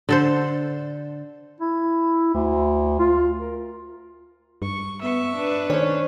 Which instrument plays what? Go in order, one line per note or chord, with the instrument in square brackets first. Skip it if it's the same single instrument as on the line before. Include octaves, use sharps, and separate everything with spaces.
[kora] D3 A4 C5
[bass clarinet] E4
D2
F4
A#4
[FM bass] G2 [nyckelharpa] C#6
[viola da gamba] B3 [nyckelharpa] E5 C#6
[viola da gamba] D4 B4
[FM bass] D#3 [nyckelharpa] C#4 [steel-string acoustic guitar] C5 C#5